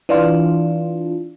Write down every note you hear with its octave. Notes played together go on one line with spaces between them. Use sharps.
E3 D4 F4